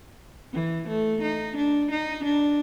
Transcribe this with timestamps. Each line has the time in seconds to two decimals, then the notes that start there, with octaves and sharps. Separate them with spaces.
0.53 E3
0.88 A3
1.22 D#4
1.57 D4
1.91 D#4
2.24 D4